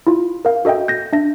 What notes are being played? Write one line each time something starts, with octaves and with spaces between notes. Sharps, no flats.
E4 F4
A#4 F5
F#4 A4 D#5 E5 G5
G6 A#6
D4 E5 A#6